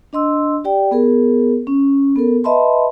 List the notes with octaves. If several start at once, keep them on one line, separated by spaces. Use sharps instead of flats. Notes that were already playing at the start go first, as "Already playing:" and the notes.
D4 D#5 C6 E6
G4 D5 G5
B3 G#4 A#4
C#4
B3 A4 A#4
B4 D#5 E5 A5 B5 C6